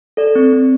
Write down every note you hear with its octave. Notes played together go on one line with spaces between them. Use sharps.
A4 D5
C4
C4